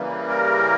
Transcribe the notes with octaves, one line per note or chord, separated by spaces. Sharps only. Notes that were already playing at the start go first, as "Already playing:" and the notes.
Already playing: C#3 E3 G3 A#3
A#4